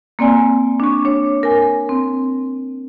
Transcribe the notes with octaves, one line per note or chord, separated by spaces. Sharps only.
A#3 C4 D5 G#5
D4 C#6
D4 C#5
A#4 G#5
C4